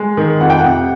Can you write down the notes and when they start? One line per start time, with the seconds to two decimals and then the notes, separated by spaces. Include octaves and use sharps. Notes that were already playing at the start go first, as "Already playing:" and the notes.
Already playing: G#3
0.17 D#3
0.40 F2 F#5
0.50 G5
0.59 C3 F#5